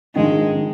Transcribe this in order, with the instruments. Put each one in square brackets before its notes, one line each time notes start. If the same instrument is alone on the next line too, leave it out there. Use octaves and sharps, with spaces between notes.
[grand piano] A#1 G#2 D#3 [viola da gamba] G#3
[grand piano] D#3